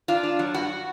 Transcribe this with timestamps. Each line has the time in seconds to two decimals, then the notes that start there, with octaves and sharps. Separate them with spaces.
0.08 D4 F4
0.23 D4
0.39 F#3
0.54 G2 F#4